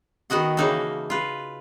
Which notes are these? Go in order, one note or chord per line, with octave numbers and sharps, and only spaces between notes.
D#3 B3 F#4 D#5 F#5
C#3 E3 A#3 D#4 F#4 A4
F4 B4